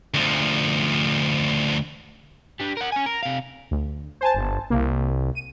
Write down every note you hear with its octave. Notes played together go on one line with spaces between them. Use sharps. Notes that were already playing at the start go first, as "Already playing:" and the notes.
D2 F3
G3 D4
A#4 F#5
C#4 G#5
A#4
C3 F5
D2
C5 G#5 A5
G1
C2 A#3
D#7